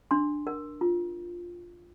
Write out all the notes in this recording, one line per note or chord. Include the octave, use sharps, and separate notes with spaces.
D4 C6
A#4
F4